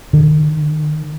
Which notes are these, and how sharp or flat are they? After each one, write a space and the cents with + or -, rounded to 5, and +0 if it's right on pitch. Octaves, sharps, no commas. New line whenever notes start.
D#3 -35